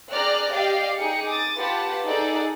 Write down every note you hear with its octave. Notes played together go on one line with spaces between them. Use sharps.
G#4 D5 G5 A#5 F6 F#6
G4 D5 D#5 F5 G5
D#4 G#4 G5 C#7
D6 D#6 A6
F4 G4 B4 F#5 A5
D#4 G#4 A4 D5 F#5